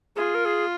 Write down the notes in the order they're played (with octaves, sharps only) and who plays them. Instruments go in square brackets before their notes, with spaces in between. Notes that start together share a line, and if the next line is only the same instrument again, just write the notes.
[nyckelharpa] F4 [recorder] G#4
[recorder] A#4
G#4